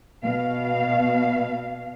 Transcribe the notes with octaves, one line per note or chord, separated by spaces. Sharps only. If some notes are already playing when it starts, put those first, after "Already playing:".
B2 F5